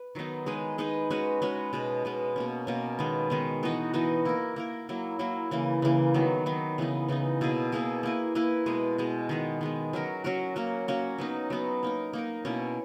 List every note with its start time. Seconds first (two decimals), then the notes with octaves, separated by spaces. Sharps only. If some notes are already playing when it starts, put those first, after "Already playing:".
Already playing: B4
0.15 D#3 F#3 B3 D#4
0.46 G#3 D#4 G#4 B4
0.78 G#3 D#4 G#4 B4
1.10 G#3 C#4 F#4 B4
1.42 G#3 C#4 F#4 B4
1.73 B2 G#3 B3
2.05 B2 G#3 B3
2.36 B2 A#3 C#4
2.67 B2 A#3 C#4
2.99 D#3 G#3 B3
3.30 D#3 G#3 B3
3.63 E3 B3 D#4 F#4
3.94 E3 B3 D#4 F#4
4.25 A#3 E4 A#4
4.56 A#3 E4 A#4
4.89 F#3 A#3 E4
5.19 F#3 A#3 E4
5.51 C#3 E3 A#3
5.82 C#3 E3 A#3
6.14 D#3 F#3 B3
6.46 D#3 F#3 B3
6.78 C#3 E3 B3 D#4
7.08 C#3 E3 B3 D#4
7.41 B2 A#3 E4 G#4
7.72 B2 A#3 E4 G#4
8.03 A#3 E4 B4
8.35 A#3 E4 B4
8.66 B2 G#3 B3
8.98 B2 G#3 B3
9.29 D#3 G#3 B3
9.61 D#3 G#3 B3
9.93 F#3 C#4 F#4 A#4
10.24 F#3 C#4 F#4 A#4
10.56 A#3 C#4 F#4
10.88 A#3 C#4 F#4
11.18 F#3 B3 D#4
11.50 F#3 B3 D#4
11.83 A#3 D#4 A#4
12.13 A#3 D#4 A#4
12.45 B2 A#3 C#4 E4